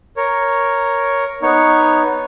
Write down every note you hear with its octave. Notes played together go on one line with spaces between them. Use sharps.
A#4 C#5
B3 D#4 C#5